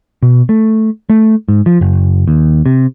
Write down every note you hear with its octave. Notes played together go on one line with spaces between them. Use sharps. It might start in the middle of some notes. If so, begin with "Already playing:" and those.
B2
A3
A3
G#2
F3
F#1
D#2
C3